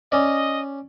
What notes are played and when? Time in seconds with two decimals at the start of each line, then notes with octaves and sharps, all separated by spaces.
0.12 C#4 D5 D#5